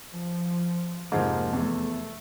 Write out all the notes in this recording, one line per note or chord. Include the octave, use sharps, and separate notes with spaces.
F3
F1 G#2 F3 A#3
E2 A3